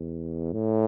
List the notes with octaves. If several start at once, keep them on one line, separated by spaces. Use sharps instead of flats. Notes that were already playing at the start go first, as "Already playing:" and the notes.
Already playing: E2
A2